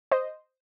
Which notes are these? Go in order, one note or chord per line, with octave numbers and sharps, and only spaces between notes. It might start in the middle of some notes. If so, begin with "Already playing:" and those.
C5 D#5